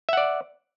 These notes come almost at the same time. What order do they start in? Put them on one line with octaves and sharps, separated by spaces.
E5 F#5 D5